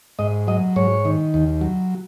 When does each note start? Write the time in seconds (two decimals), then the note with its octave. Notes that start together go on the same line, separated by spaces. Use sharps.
0.19 G#2 D#5
0.47 F#3 D#5
0.76 G#2 C#5
1.05 D#3
1.34 D#2
1.61 F#3